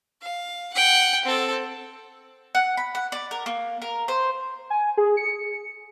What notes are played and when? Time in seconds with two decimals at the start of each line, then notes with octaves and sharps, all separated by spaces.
0.22 F5
0.74 F#5 G5
1.25 C4 A4
2.55 F#5
2.77 B5
2.95 F#5
3.12 D5
3.31 A#4
3.46 A#3
3.82 A#4
4.08 C5
4.70 G#5
4.97 G#4
5.17 C#7